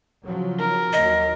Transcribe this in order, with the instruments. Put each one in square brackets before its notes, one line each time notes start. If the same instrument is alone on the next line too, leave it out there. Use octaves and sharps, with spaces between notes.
[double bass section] C#3 F3 F#3
[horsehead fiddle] A#4
[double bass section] D#2 F#3 [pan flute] D#5